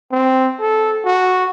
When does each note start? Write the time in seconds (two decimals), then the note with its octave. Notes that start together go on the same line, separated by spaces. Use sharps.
0.12 C4
0.60 A4
1.05 F#4